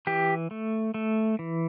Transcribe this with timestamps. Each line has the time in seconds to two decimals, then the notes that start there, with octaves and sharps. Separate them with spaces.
0.07 E3 G4
0.51 A3
0.94 A3
1.39 E3